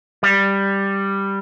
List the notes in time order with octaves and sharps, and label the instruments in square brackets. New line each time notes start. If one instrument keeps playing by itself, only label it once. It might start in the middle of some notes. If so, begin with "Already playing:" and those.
[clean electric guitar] G3